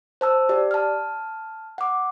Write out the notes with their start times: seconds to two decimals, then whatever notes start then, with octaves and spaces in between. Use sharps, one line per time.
0.21 C5 A5 E6
0.49 G4 D5
0.71 A5 F6
1.78 F#5 D6